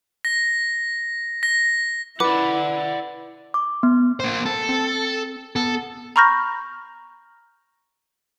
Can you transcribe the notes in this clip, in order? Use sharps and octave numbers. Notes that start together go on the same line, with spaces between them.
A#6
A#6
E4 B4 D5 F#5 D6
D6
B3
A#3 C5
A4
C4
B3 A4
A#5 B5 C#6 F6 G6 A#6